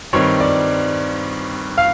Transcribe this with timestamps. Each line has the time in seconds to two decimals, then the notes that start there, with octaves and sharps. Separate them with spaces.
0.13 G2 D#3 G3 C4 C#5
0.40 D5
1.78 F5